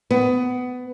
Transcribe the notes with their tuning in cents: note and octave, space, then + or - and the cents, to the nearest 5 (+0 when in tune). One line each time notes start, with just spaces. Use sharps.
B3 +20